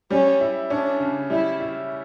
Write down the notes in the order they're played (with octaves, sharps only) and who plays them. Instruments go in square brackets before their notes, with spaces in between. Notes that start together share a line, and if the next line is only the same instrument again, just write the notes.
[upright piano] G3 [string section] C#4
[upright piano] E4
[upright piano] C#4 [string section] D4
[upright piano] C#3
[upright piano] G3 [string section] E4
[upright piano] E4